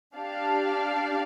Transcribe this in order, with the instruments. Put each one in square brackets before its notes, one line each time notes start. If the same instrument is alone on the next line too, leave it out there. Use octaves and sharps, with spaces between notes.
[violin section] D4 G4 D5 F5 A5